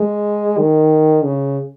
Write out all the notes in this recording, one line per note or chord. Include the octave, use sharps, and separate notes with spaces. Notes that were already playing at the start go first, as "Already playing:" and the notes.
Already playing: G#3
D#3
C#3